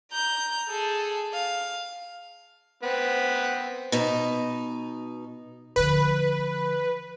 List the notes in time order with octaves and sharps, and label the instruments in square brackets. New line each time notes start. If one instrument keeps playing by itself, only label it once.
[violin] A#5 G6
G#4 A4
F5
[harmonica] B3 C4
[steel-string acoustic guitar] B2 D#4
[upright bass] D3 F3 [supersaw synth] B4